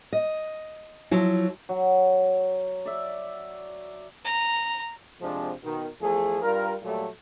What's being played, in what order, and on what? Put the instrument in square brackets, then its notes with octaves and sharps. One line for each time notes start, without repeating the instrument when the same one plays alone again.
[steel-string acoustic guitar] D#5
F3 F#3 E4
[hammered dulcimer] F#3
D5 E5
[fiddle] A#5
[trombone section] F2 C3 F3 G#3 D4
B2 D#3
E2 F3 A3 G#4
G2 G3 F4 A#4
A#2 F#3 G3 A3